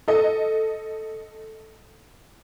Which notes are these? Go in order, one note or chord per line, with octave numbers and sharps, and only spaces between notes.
A4 D#5